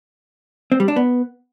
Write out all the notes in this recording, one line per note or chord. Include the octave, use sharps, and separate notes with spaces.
C4
G3
D4
B3